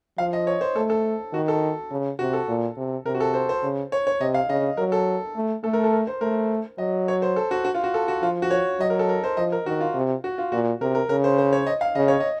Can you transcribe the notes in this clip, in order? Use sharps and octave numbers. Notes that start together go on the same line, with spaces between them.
F3 F5
D#5
C#5
C5
A3 A4
A4
D#3 F#4
A4
C#3
C3 F#4
A4
A#2
C3
C3 A#4
F#4
A4
C5
C5
C#3
C#5
C#5
C3 D#5
F5
C#3 D#5
F#3 A#4
A4
A3
A3 A4
A#4
A4
A#4
C5
A3 A#4
F#3 D#5
C#5
C5
A4
F#4
F#4
F4
F#4
A4
F#4
F3 F4
F#4
C#5
F#3 D#5
A#4
A4
A#4
C5
F3 D#5
A#4
D#3 F#4
F4
C3
F#4
F4
A#2 F#4
C3 A#4
A#4
C#3 A#4
C5
C5
C#5
D#5
F5
C#3 D#5
C#5
D#5